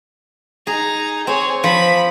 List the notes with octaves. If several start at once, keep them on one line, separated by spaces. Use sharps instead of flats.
D#4 G#4 A#5
C4 G#4 C#5
F3 B5